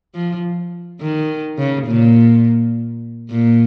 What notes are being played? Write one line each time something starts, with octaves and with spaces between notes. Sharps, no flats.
F3
D#3
C#3
A#2
A#2